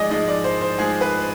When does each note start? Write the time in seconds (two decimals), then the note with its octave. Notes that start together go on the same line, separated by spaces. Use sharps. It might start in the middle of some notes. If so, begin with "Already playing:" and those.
Already playing: G#2 F3 G#3 G#4 D5 D#5
0.11 G#2 F3 G#3 D#5
0.28 D5
0.44 C5
0.61 C5
0.78 G#2 F3 G#3 G#4
1.01 B4